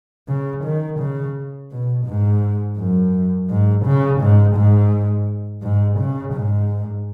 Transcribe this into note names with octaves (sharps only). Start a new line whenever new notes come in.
C#3
D#3
C#3
B2
G#2
F#2
G#2
C#3
G#2
G#2
G#2
C#3
G#2